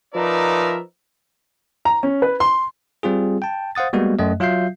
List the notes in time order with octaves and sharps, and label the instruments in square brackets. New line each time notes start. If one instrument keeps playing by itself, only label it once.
[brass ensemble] F3 D#4 A#4 B4 D5 E5
[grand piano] A#5
C#4
B4
C6
[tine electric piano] G3 C4 F4 G#4
G5 A5
C5 F5 F#5 D#6 A6
G3 G#3 A#3 B3 F#4
F#2 A3 D#5
F#3 F4 E5 F5 G6 C7